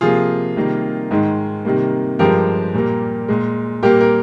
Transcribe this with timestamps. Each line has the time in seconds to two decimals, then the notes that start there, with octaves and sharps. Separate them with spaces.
0.01 C3 F3 A#3 F4 G#4
0.56 C3 D#3 G3 A#3
1.11 G#2 D#3 G#3
1.65 C3 D#3 G3 A#3
2.19 G2 F3 G#3 G4 A#4
2.74 A#2 G3 A#3
3.28 A#2 G#3
3.83 A#2 G3 A#3 G4 A#4
4.01 A#4